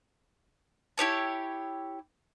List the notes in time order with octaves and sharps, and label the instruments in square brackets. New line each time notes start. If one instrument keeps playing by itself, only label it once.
[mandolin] E4 G4 C#5 A5